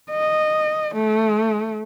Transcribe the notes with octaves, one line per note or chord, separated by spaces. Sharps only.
D#5
A3